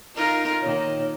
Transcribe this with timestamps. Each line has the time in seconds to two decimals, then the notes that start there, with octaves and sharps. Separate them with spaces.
0.15 D#4 F4 A#4
0.61 A#2 D#3 C#5